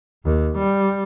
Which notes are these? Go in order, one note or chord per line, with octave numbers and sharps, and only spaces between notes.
D#2
G3